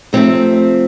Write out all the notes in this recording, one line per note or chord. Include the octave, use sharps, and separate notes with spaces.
C3 F3 A3 C4